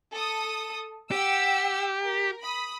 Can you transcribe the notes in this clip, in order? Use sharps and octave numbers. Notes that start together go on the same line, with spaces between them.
A4 D#6
G4 F#5 G5 E6
A#4
B5 D#6